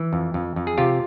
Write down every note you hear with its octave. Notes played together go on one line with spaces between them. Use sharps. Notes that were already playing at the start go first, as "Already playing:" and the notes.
Already playing: E3
F2
F2
F2
G#4
C3 F4 G4